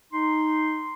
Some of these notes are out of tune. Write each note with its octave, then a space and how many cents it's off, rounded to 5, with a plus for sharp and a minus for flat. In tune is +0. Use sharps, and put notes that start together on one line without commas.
D#4 +0 C6 +0